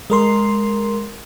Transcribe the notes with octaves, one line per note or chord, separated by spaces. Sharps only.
G#3 A#4 C6